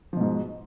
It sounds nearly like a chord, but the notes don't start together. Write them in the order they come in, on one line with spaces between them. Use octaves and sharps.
F3 B2 G#2